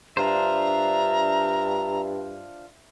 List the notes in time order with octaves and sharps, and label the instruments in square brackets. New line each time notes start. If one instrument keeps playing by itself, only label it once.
[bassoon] G2 [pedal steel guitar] D4 F4 C5 [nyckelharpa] E5 [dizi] A#5